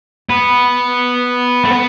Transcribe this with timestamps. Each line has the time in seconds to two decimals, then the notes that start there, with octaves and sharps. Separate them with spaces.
0.29 B3
1.65 A3
1.71 B3